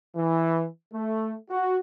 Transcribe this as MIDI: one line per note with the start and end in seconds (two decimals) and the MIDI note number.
0.15 0.65 52
0.93 1.34 57
1.49 1.77 66